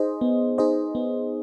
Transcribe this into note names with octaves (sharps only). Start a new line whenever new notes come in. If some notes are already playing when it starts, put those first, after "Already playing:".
Already playing: D#4 G#4 C5 D#5
B3
D#4 G#4 C5 D#5
B3